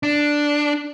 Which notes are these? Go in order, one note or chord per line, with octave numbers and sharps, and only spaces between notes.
D4